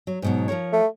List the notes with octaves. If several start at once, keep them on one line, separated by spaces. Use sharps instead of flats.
F#3
G#2 B2 F#3
F3 A#4 C#5
A3